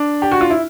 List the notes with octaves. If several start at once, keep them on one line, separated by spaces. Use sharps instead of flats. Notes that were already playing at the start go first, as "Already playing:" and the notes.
Already playing: D4
G4
F#4
F4
E4